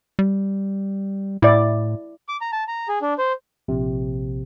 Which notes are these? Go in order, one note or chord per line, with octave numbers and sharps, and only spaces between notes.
G3
A2 E4 D5
D6
A#5
A5
A#5
G#4
D4
C5
A#1 C3